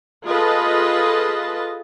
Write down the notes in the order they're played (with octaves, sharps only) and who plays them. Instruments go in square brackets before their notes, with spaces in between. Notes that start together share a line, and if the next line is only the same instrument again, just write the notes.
[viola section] F4 G#4 A4 B4 D#5 A5